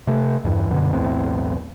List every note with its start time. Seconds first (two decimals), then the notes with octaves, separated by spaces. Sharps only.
0.07 C3 A3
0.44 E2 G2 E3
0.70 F#2 B2 D3
0.93 B1 E2 A2 C4